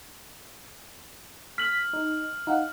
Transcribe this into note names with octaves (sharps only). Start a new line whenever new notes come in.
F6 B6 F#7
D#4
D#4 F5 F#5